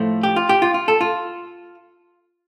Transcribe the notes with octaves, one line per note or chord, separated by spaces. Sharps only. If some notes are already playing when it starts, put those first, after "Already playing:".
Already playing: A2 F3 A3
G4
F4
G4
F4
F4
A4
F4